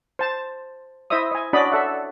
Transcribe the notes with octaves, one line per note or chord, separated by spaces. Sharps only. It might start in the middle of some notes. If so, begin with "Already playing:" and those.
C5 A5
E4 C5 D#5 E5 D#6
D#5 G#5
C#4 D4 F#4 D5 D#5 B5
A4 E5 F#5